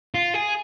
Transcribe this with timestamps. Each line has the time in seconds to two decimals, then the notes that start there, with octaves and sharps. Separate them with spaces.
0.14 F4
0.34 G#4